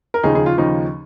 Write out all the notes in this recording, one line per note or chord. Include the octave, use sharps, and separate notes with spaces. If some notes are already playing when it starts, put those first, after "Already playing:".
A#4
D#2 C#3 F3 D#4 G#4
D#4 G#4
F4
D#2 C#3 F3 D#4